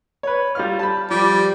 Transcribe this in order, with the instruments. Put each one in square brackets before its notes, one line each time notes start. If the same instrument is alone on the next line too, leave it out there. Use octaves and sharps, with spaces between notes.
[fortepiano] B4 C#5
G3 F4 F6
A5 B5
[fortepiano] F3 [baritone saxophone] G3